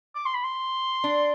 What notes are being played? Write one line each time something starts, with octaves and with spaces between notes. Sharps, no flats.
D6
C6
B5
C6
D4